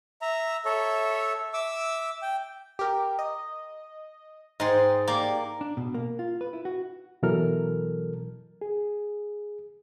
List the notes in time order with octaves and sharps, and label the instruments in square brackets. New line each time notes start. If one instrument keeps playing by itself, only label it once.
[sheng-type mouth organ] E5 A#5
A4 C#5 E5
E5 D6 E6
G5
[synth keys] G4 A#4
D#5
[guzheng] G#2 C6 [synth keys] D#5 G5
[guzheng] A#3 [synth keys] G4 D5
[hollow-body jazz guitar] D4
B2
A#3
F4
B4
E4
F#4
[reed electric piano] B2 E3 F#3 A4 A#4 F6
G#4